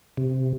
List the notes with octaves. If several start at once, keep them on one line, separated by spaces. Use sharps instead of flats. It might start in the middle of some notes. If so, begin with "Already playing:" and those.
C3